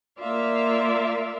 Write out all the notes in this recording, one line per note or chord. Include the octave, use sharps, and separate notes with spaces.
A#3 F4 D5 E5 F5